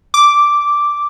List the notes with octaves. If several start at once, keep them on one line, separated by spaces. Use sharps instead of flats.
D6